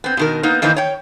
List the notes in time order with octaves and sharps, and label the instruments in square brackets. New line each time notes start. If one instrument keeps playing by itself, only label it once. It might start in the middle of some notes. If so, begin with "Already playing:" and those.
[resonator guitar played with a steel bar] B3 C4
B2 D#3 A#4
A#3 B3 D#4
D#3 E3 A#3 D#4 C5
C#5 G5